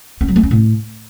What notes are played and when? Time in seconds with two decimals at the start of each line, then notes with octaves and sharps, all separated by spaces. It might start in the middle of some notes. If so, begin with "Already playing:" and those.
0.21 C#4
0.28 F#3
0.36 A#3
0.43 C#4
0.51 A2